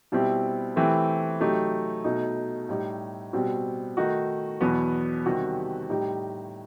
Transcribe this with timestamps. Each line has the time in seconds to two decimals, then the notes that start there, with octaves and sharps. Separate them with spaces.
0.12 B2 G3 C4 E4 G4
0.76 E3 A3 C4 E4 G4
1.40 C3 F#3 A3 D#4 G4
2.04 B2 A3 D#4 F#4
2.69 A2 G3 D#4 G4
3.33 B2 G3 C4 F#4
3.97 D#3 A3 D#4 F#4
4.61 E2 B2 F#3 B3
5.25 C3 D#3 G3 C4 F#4
5.89 A2 G3 D#4 G4